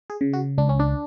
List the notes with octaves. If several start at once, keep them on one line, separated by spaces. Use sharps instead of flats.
G#4
C#3
F#4
C#2 D4
C#4
D4